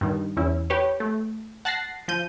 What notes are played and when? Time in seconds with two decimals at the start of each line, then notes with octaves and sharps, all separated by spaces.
0.01 G2 D#3
0.37 E2 C#4 E4
0.70 G4 B4 C#5
1.00 A3
1.65 F#5 A5 F#6 A6 A#6 C7
2.08 F3 G6 D#7